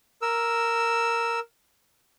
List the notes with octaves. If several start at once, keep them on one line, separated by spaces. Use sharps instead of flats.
A#4 E6